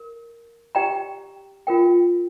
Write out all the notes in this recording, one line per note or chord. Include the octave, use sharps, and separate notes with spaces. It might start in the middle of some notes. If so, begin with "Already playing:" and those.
Already playing: A#4
G4 D5 G5 A#5
F4 A#4 G5